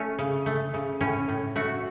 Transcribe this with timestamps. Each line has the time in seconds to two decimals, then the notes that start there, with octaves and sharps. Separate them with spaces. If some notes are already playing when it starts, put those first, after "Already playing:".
Already playing: A3 C#4
0.19 C#3
0.46 A3
0.74 C#3
1.01 A2 C#4
1.29 A2
1.56 A3 F#4